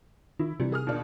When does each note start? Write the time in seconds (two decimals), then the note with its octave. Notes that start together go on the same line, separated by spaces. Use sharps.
0.40 D#3 E4
0.60 C3 E3 G3
0.72 G#4 D#6 F6
0.87 D#2 B2 D4